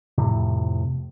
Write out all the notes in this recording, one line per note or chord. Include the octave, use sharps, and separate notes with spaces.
F2 A2 C3